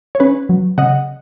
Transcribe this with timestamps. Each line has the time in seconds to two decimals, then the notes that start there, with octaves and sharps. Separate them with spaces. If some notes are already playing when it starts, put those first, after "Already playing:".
0.15 C#5
0.20 C#4 B4
0.49 F#3
0.78 C#3 D#5 F#5